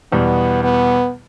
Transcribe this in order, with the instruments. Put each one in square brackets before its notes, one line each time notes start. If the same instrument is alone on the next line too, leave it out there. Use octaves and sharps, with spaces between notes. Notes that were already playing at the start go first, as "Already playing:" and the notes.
[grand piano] E2 B2 G3 [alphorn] B3
[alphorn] B3